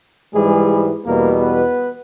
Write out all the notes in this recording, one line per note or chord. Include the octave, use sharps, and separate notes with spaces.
G#2 E3 G3 G#3 G#4
E2 B2 G3 A#3 A#4
B3 B4